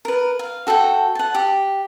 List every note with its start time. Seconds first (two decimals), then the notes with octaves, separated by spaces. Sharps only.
0.05 A#4 B4
0.39 F5
0.67 F#4 A4 F#5 G5
1.15 F#5 A5
1.34 G4